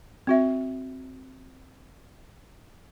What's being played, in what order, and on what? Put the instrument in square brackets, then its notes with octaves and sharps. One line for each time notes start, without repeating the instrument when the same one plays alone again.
[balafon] C4 F#4 E5